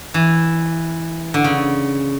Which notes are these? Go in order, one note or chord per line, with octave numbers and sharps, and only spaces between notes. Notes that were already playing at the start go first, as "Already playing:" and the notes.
E3
D3
C#3